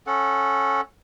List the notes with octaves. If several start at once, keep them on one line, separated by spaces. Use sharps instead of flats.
C#4 A4 F#5